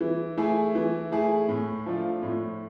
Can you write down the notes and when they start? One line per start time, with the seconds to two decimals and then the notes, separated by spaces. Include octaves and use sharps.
0.01 E3
0.37 A3 E4 G#4
0.75 E3
1.12 A3 E4 G#4
1.49 A2
1.86 F3 A3 D4 F4
2.23 A2